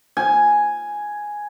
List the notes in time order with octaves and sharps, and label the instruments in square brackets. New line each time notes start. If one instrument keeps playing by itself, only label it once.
[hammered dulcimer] G#5